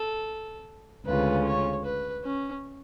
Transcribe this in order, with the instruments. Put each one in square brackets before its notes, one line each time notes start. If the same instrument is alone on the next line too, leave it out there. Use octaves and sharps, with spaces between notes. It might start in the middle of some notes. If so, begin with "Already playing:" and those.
Already playing: [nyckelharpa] A4
[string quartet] D2 C#3 G#3 C#4 F4 [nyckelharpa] B4
[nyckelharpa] C#5
B4
C#4